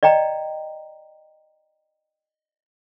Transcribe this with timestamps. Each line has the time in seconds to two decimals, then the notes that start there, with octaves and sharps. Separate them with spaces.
0.03 D5 D#5 G5 A#5